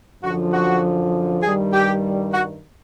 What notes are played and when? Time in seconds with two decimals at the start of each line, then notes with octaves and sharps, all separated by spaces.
0.23 F#2 D3 F3 F#4
0.53 F#4
1.43 G2 D#3 G3 G#4
1.73 G4
2.33 F#4